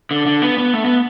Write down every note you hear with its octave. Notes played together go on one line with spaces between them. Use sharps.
D3
D3
B3
B3
A3
B3